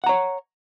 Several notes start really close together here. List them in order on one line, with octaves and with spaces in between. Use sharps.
F#5 A#5 C#5